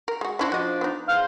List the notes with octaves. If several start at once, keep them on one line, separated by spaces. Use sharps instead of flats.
A#4
G#3 F#4
C#4 D4 E4 F#4 C5
F3 D4 F#4 D#5
B3 D#4
E2 C5 F5